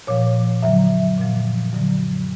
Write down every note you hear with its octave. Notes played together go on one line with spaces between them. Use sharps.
A#2 F3 C#5
F#2 D3 F#3 E5
A#2 F3
F#2 D3 F#3